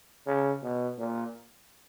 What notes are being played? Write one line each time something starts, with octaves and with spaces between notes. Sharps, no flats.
C#3
B2
A#2